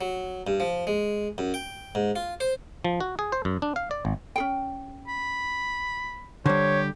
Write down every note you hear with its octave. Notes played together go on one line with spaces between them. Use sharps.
F#3
G2
F3
G#3
F#2
G5
G#2
F4
C5
F3
F#4
G#4
C5
F#2
D4
F5
D5
G#1
C#4 G#4 G5
B5
D3 G3 G4 C5 C#5